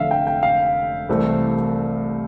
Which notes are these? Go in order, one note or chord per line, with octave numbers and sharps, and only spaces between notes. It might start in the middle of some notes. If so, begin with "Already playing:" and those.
Already playing: F1 F2 D3 E5 F5
G5
G5
F5
C2 C3 E3 A3 C4